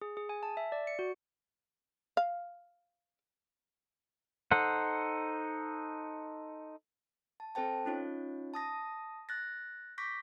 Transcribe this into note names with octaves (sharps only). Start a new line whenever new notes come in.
G#4
G#4
G#5
A5
E5
D5
C#7
F#4
F5
D#4 A4 C5 F#5
A5
C4 A4 C5 G5 A5
C#4 D#4 F4 C#5
A5 D#6 A#6
F#6 A6 A#6
C#6 D6 G6 A#6 B6